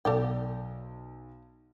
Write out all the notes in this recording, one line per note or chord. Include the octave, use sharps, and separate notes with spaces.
B1 A4 D5 G5